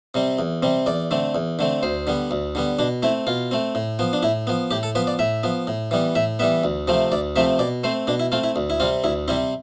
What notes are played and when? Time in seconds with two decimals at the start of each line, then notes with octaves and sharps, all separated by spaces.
0.14 C3 G3 C4
0.39 E2
0.63 C3 G3 C4
0.86 E2 D5
1.11 D3 A3 C4
1.35 E2
1.59 D3 A3 C4
1.83 D2 C5
2.07 D3 G3 B3
2.31 D2
2.55 D3 G3 B3
2.79 B2 D4
3.03 A3 C4 E4
3.27 B2 F4
3.51 A3 C4
3.75 A2
3.99 F3 B3
4.13 D4
4.23 A2 E4
4.47 F3 B3
4.71 A2 G4
4.83 A4
4.95 F3 B3 B4
5.07 D5
5.19 A2 E5
5.43 F3 B3
5.67 A2
5.91 E3 G3 B3
6.15 A2 E5
6.39 E3 G3 B3 E5
6.64 D2
6.88 C3 F3 A3 C4
7.12 D2 D5
7.36 C3 F3 A3 C4 E5
7.59 B2 D5
7.84 A3 C4 C5
8.07 B2 D4
8.20 E4
8.32 A3 C4 F4
8.44 E4
8.56 D2
8.70 E4
8.80 C3 G3 C4 F4
9.04 D2 E4
9.28 C3 G3 C4 E4